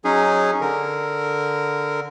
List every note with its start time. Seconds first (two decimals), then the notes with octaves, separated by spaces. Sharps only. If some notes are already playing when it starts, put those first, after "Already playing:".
0.05 F#3 C#4 D#4 G#4
0.61 D3 A#4